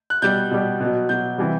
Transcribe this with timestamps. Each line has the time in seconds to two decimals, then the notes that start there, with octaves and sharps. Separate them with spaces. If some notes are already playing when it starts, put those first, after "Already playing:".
0.10 F#6
0.22 B2 G3 G6
0.51 B2 G3
0.80 B2 F#3
1.09 B2 F#3 G6
1.38 C3 E3 G3